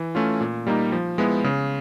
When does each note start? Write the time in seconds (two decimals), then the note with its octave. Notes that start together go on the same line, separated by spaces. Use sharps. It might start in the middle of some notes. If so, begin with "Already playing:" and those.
Already playing: E3
0.15 A3 C#4 F4
0.41 A#2
0.67 G3 A#3 D#4
0.92 F3
1.18 G#3 B3 E4
1.44 C#3